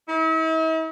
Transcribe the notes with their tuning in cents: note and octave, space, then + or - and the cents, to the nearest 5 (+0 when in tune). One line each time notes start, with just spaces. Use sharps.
E4 -45